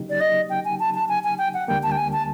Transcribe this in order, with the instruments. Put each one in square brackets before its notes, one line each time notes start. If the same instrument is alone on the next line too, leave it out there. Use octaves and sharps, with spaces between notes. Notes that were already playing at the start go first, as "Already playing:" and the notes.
Already playing: [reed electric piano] C#3 F#3 A#3 D#4 G4
[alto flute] D5
D#5
G5
G#5
A5
A5
G#5
G#5
G5
F#5
[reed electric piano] D2 D3 G3 A#3 [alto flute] G5
[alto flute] A5
G5
G#5
A5